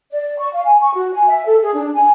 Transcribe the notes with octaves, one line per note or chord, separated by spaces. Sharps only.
D5
C#6
F5
G#5
C#6
F#4
G#5
E5
A4
G#4
D4
G#5